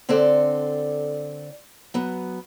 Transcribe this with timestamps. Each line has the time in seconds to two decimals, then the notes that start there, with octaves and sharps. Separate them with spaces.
0.09 D3 C4 D4 A4 D5
1.94 F#3 B3